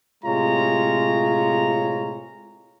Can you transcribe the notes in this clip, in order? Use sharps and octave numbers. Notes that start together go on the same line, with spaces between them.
A2 C3 G#3 F4 C#5 A#5